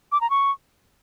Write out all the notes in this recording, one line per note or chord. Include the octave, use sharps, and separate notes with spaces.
D6
A#5
C#6